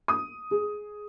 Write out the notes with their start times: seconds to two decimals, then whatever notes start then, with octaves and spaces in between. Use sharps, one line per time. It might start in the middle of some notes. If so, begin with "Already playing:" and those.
0.08 D#6
0.51 G#4